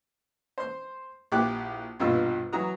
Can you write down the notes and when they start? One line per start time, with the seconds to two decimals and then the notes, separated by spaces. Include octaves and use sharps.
0.58 C5 C6
1.32 A#1 E4 G4 D6 F#6
2.00 A#1 G2 B2 F4 E6
2.52 E3 F#3 F#4 A#5 D#6